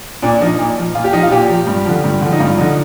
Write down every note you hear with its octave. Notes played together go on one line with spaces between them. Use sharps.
A#2 D4
F3 D#4
A#2
F3
A#2 F4
G4
F3 D#4
F4
A#2 G4
F3
G2
D3 F3
G2
D3 F3
D#4
G2 F4
D3 F3 D#4